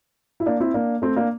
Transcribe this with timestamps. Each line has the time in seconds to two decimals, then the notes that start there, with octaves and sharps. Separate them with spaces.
0.40 E4
0.46 A#3 D4
0.60 C4 E4
0.74 A#3 D4
1.02 A3 C4
1.16 A#3 D4